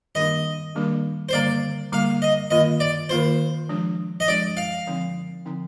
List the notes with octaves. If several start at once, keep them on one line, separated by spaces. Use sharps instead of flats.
D#3 G3 A#3 D4 G4 D#5
D#3 G3 A#3 D4 G4
C5
D3 G3 A#3 D5
D3 G3 A#3 F5
D#5
D#3 A#3 F4 D#5
D5
D#3 A#3 F4 C5
F3 G#3 D4 G4
D#5
F3 G#3 D4 G4 D5
F5
D3 F3 C4 D#4
D3 F3 C4 D#4